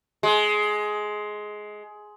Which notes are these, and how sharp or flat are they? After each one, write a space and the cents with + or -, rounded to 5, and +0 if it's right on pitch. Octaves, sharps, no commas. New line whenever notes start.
G#3 +15